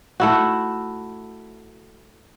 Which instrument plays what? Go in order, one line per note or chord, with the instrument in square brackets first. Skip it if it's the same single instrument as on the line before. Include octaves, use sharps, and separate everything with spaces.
[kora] A3 E4 F#4